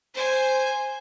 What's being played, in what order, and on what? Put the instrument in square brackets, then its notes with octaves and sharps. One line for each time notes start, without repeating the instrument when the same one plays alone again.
[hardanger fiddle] C5 G#5